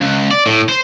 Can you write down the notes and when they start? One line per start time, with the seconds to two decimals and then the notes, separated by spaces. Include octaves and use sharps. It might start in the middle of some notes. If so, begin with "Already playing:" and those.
0.01 C#2
0.31 D5
0.46 A2
0.69 C5